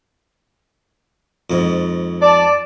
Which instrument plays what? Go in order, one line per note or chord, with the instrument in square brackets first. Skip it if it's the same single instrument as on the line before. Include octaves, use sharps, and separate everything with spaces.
[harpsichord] F2 G#2
[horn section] D5 A5